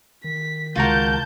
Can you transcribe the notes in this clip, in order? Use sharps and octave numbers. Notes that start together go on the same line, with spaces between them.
D#3 B6
C#2 F4 F#4 A#4 A5 G6